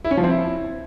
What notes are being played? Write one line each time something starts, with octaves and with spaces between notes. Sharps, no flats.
E4
C#4
F3
C4
E4